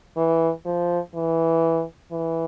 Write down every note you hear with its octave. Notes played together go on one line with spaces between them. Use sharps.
E3
F3
E3
E3